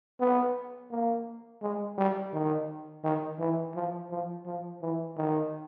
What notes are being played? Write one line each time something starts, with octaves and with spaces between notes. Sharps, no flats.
B3
A#3
G#3
G3
D#3
D#3
E3
F3
F3
F3
E3
D#3